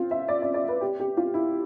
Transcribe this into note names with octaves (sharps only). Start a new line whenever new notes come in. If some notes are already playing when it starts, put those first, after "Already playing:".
Already playing: C4 F4
E5
D5
D5
D5
B4
G4
G4
F4
E4